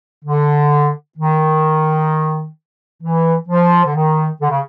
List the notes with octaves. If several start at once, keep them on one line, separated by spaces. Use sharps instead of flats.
D3
D#3
E3
F3
D3
D#3
D3
C#3